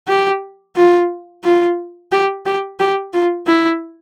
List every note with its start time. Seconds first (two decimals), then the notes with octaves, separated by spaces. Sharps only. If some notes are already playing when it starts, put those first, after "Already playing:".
0.08 G4
0.76 F4
1.44 F4
2.12 G4
2.46 G4
2.80 G4
3.13 F4
3.47 E4